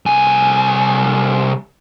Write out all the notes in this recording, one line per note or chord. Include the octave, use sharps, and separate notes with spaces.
C2 G#5